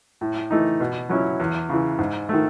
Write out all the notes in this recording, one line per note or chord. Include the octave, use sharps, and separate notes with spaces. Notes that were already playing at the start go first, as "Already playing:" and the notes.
A2
E3 A3 D#4
B2
F#3 C#4 E4
E2
C#3 E3
G#2
D#3 A3